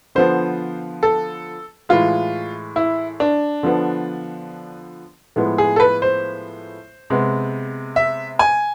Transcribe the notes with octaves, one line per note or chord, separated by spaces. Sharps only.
D3 F3 B3 C5
A4
A2 E3 G#3 F4
E4
D4
D3 F3 B3
A2 F3 G#3 B3
G#4
A4
B4
C5
C3 G#3 B3
E5
G#5